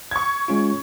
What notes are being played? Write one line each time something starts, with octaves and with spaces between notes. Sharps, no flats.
C#6 G#6
G#3 C#4 F4